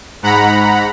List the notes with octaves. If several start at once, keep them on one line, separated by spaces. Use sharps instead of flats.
G#2 F#5 A#5 B5